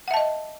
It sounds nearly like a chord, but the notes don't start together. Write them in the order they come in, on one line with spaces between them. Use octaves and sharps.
F#5 E5 A5 D#5